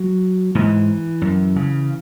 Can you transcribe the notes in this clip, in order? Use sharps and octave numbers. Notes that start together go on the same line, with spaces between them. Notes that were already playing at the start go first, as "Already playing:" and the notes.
Already playing: F#3
G#2 E3
F#2
C#3